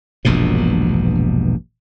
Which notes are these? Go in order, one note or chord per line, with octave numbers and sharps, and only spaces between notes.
E1 A#1 G2 B2